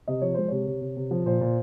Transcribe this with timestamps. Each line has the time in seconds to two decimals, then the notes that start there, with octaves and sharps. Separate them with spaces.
0.08 C3 D#5
0.21 F3 C#5
0.34 G#3 C5
0.48 C3 C#5
0.67 C3
0.81 C3
0.97 C3
1.11 F3
1.26 A#2 C5
1.41 A#2